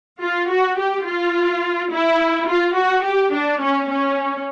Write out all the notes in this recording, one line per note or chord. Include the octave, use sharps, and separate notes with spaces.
F4
F#4
G4
F4
E4
F4
F#4
G4
D4
C#4
C#4